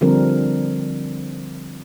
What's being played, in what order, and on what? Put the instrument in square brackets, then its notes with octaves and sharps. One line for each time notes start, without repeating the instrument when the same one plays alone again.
[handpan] D3 F3 G3 C4 D4 A#4